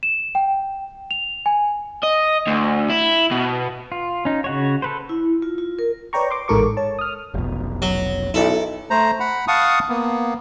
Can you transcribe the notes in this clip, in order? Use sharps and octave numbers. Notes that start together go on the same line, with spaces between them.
E7
G5
F7
G#5
D#5
D2
E4
B2
F4
C#4 D#4
C#3 F#4 C#5
A4 B4 C5
E4
F4
F4
A#4
B4 C#5 D5 G5 A#5 C#6
C6 D6
A1 G#2 A4 A#4 C#6 D6
C#5 A5
D#6 F6
F1 B1
F#3
B1 E4 A4
A3 C5 A#5
F#5 B5
F5 F#5 A5 C#6 D#6
A#3 B3